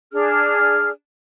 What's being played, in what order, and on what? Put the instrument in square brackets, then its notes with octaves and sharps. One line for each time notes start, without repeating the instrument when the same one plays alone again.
[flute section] D4 G#4 F6